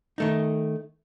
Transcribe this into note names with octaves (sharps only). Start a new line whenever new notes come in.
D#3 A3 D#4